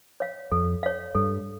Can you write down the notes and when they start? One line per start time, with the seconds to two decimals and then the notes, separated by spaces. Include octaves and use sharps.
0.20 C#5 F5
0.52 F2 A4
0.83 C#5 F5
1.15 G2 A4